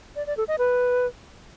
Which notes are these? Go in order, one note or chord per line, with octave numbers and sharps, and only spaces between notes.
D5
D5
A4
D#5
B4